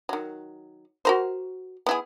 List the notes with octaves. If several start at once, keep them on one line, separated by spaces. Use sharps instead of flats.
D#3 F#3
F#4 A#4 C5
B3 E4 G#4